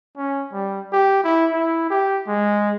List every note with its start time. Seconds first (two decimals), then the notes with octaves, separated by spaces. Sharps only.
0.17 C#4
0.53 G3
0.93 G4
1.24 E4
1.53 E4
1.91 G4
2.28 G#3